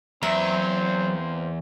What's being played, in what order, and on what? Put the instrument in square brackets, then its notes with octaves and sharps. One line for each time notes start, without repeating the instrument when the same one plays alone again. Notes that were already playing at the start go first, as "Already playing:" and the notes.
[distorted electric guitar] E2 [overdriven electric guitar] F#3 A#5 [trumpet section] A#3 C4 C5 [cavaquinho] E5